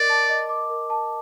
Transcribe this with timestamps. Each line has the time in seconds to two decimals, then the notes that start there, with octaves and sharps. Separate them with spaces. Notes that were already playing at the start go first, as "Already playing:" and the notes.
Already playing: A#4 D5 D#5 D6
0.09 A5
0.29 D#5
0.49 D6
0.70 A#4
0.90 A5